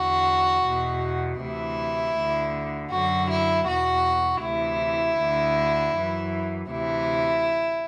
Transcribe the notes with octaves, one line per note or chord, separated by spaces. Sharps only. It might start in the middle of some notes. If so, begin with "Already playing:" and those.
Already playing: E2 D3 F#4
E2 B2
D2 C3 E3 E4
D2 D3
F#2 D3 F#4
E4
E2 B2 F#4
D2 C3 E3 E4
D2 D3
F#2 E3
D2 C3 E3 E4